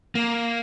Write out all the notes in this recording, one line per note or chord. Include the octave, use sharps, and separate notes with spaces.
A#3